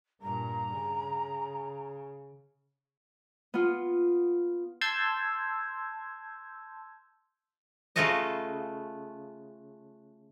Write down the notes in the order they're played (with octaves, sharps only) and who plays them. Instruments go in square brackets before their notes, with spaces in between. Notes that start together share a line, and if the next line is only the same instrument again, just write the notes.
[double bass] G2 A#2 [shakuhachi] A#5
[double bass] C#3
[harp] B3 F4
[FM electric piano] A5 C6 E6 G6 G#6
[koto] C#3 A3 F4 F#4 A4 D#5